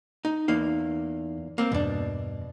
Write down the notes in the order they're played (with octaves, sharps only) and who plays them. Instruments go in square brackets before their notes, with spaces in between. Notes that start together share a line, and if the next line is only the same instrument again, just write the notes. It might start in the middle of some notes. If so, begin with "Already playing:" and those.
[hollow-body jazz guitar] D#4
[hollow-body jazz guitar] E2 A#3 F5 [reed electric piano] D#4
[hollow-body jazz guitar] A#3 C4
[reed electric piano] E2 G2 [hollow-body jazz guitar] B2 D4